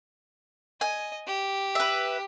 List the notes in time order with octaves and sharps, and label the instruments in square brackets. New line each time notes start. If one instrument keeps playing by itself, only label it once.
[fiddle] D#5 [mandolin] G#5
[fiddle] G4
[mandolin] B4 E5